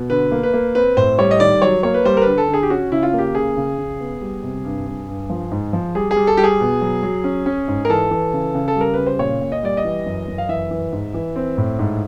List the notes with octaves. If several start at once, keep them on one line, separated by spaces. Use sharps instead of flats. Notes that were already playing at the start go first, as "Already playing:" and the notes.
Already playing: B2
D3 B4
A#3
B4
A#3
C4 B4
A2 C5
G3 C#5
D#5
D#3 D5
F#3 C#5
A#3 C#5
B4
G3 C5
A#4
D3 B4
A4
D3
G#4
G4
C#4 F#4
C#3 E4
F4
A#3 G4
C#3 G#4
C#3
C#3
B3
G3
C3
G2
G2
G2
F3
G#2
F3
G3 G#4
G#4
G3
A4
G3 G4
G#4
B2
F#3
F#3
C#4
C#4
G#2
A#4
E3 A4
E3
C#3
C#3
A4
G3 A#4
C#3 B4
C5
A#2 C#5
A#2
D#5
G3 D5
D#5
E3
F#2
F#2
F5
E3 E5
E3
G#2
E3
C4
A2
G#2